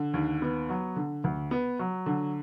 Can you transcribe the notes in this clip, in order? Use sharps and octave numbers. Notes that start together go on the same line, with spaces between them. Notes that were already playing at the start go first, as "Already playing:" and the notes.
Already playing: D3
D#2
B3
F#3
D3
D2
B3
F#3
D3